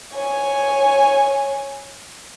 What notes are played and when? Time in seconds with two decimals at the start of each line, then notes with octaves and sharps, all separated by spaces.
0.14 C#5 G#5